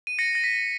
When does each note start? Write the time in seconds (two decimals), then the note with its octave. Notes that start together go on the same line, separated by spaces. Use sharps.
0.07 D#7
0.19 A#6 C#7
0.35 A#6
0.44 B6